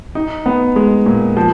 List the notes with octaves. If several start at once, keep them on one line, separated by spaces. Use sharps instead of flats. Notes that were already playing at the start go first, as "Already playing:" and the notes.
D#4
B3
G#3
A#2
F3